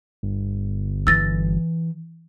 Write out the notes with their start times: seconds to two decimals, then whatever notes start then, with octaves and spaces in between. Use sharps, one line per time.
0.23 G1
1.07 E3 E6 A6 A#6